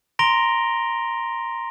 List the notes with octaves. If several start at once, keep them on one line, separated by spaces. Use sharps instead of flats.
A#5 C6 A#6 D7 F7 G7